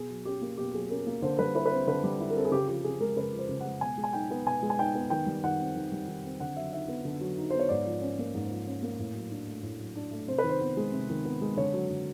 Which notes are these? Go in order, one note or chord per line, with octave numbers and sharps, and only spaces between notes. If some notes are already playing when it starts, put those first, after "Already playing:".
Already playing: B2 G#4
F#3
C#4 G4
A#3
B2 G4
F#3 G#4
C#4 A#4
A#3
D3 C5
G3 B4
E4 B4
B4
C4 C5
D3 B4
G3
E4
A#4
C4 A4
G#4
C#3 G4
F3 G4
C#3 G#4
G#3 A#4
C#3 B4
F3
C5
C#3
G#3 F#5
B2 G#5
G#3
G#5
D#4 G5
B3
B2 G#5
G#3
G#5
D#4 G5
B3
D#3 G5
G3
D#3 F#5
C4
D#3
G3
D#3
C4
D3 F#5
F#3 E5
D#4 E5
B3
D3
F#3
D#4
B3 C5
C#5
G#2 D5
F3
C#4
A#3
G#2
F3
C#4
A#3
A2
F#3
D4
A3
A2
F#3
D4
A3
C3 C5
B4
D#3
C5
B3
G#3
C3
D#3
B3
G#3
D3 C#5
F#3
D3